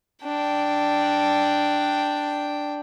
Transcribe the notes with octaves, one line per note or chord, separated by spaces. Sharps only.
D4 G5